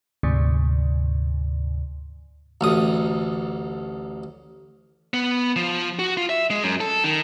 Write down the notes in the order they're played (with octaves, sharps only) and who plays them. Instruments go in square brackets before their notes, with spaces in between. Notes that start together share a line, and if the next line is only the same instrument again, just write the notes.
[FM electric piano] D2 G#2 C3
[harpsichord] A1 D2 D#6
[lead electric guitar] B3
F3
F#4
F4
E5
G#3
F#2
A4
D#3